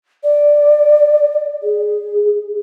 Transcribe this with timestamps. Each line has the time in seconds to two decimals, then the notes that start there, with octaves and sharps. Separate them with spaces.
0.23 D5
1.63 G#4